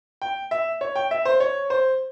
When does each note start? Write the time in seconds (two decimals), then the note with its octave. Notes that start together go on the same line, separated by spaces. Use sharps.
0.22 G5
0.51 E5
0.81 C#5
0.96 G5
1.11 E5
1.25 C5
1.40 C#5
1.70 C5